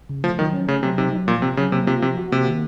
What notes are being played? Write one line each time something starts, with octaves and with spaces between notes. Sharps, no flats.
C#3
F3 A3
D#3 F#3
C#4
C#3 A3
C3 F#3
C3 D#4
F#3
A#2 F3
C3 C4
C#3 F#3
C3 A#3
C3 F4
C3 F3
F#4
C3 A#3
D#3